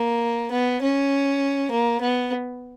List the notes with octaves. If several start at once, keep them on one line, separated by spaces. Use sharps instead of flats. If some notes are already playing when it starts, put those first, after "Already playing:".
Already playing: A#3
B3
C#4
A#3
B3